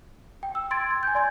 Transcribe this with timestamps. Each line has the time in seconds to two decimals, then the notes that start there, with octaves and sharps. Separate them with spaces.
0.43 G5
0.55 E6
0.71 C6 G#6 A6 D7
0.91 G#6
1.03 G#5 G6
1.15 D5 C6 G#6